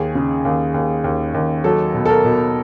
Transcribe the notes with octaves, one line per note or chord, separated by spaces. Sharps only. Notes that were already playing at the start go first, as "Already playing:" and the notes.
Already playing: D#2 G#4
C#3
D#2
D#2
D#2
D#2
F#3 A4
B2
A4
A#4
B2